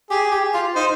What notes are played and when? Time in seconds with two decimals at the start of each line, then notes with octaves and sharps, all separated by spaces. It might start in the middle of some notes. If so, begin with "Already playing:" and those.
0.10 G4 G#4
0.32 G4
0.54 F4
0.75 D#4 C5